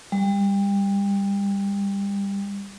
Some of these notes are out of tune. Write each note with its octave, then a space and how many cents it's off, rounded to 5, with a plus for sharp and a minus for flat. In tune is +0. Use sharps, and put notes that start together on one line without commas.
G3 +25